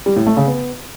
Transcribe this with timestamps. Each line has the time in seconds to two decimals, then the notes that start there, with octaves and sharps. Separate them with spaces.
0.06 G3
0.16 A2
0.27 A3
0.37 C#3
0.47 B3